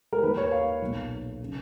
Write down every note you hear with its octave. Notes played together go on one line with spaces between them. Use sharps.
A#4
D#2 D#3 B4
C#5
F5
B1 A#2
C#3